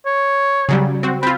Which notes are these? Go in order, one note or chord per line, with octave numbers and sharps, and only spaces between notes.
C#5
C#3 F#3 G3
C4 F#4
C4 F4 B5